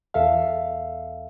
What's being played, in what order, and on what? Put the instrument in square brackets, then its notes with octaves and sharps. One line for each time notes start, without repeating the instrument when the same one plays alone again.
[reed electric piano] E2 A4 E5 F5